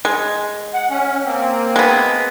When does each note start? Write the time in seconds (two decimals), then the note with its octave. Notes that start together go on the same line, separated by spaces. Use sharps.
0.05 G#3
0.74 F#5
0.90 C#4
1.25 A#3 C4
1.76 G#3 B3